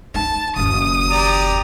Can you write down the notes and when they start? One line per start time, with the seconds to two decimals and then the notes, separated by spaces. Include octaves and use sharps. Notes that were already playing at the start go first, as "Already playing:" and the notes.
0.14 D#4 A5
0.56 F#1 D#2 D#6
1.10 G4 D5 A#5